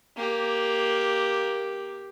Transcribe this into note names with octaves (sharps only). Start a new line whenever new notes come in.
A#3 G4